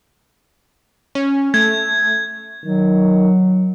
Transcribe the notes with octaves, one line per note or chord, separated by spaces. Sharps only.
C#4
A3 G#6
D#3 F#3